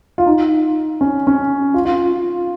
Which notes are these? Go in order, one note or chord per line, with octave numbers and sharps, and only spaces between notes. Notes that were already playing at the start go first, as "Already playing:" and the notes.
F4
D#4
C#4
C#4
F4
F4